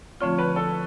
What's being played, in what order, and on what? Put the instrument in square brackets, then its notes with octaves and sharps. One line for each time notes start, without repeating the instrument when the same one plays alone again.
[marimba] D3 F3 A3 C4 F4 [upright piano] C#5
[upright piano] B4
A4